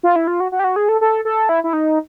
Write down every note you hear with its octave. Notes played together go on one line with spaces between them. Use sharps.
F4
E4
F4
F#4
F#4
G4
F#4
G#4
A4
A4
A4
E4
E4
D#4